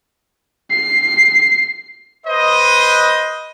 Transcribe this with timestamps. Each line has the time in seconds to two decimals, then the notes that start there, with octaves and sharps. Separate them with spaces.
0.71 C7
2.25 B4 C5 D#5